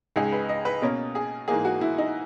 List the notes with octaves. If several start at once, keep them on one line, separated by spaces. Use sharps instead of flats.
C#2 C#3 G#3 D#4 G#4
B4
D#5
B4
B2 A#3 C#4 A#4
G#4
G#2 E3 A#3 G#4
F#4
E4
D#4